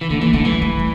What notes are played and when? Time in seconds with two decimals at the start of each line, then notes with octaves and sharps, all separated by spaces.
0.01 E3
0.10 D3 A3
0.21 E3 A#3
0.33 D3 A3
0.45 E3 G3
0.62 A3
0.79 G3